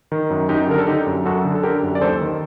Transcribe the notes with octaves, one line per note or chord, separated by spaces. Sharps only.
D#3
F#2
F#2 D#4 G4
D3 A#4
A4
D3 D#4 G4
F#2
F#2 F#4 A4
D3
A4
D3 G4 A#4
F#2
D5
D#2 A4 C5
D#3